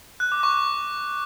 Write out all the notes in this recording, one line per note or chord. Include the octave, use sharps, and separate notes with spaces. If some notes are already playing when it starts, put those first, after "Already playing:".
F#6
D6
C#6